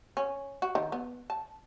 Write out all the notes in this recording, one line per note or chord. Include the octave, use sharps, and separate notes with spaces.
C#4
F#4
D#3
B3
A5